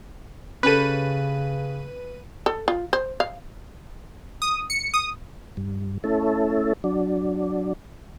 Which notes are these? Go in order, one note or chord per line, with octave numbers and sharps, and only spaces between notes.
C#3 C#4 G4 A4 B4 D#7
A4
F4
C5
F5
D#6
C#7
D#6
G2
A3 C#4 E4 A4
F#3 D4